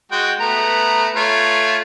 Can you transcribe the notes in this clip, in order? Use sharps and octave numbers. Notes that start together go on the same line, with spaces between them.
G#3 F#4 G5
A3 B3 A#5
A3 F4 C#5